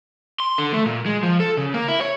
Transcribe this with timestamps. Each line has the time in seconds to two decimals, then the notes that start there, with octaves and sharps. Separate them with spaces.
0.40 C6
0.58 D3
0.74 A3
0.86 A#2
1.06 G#3
1.23 F3
1.40 A4
1.57 C#3
1.74 A#3
1.88 E4
2.01 C#5